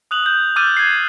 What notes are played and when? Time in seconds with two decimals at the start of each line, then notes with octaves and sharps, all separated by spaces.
0.11 D#6 F#6 F7 F#7
0.26 G6
0.56 D6 E6 F6 G6 A6 D#7
0.77 G#6 C7